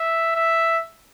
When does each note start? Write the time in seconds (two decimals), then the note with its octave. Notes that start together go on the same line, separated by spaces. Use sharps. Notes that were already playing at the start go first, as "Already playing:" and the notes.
Already playing: E5
0.35 E5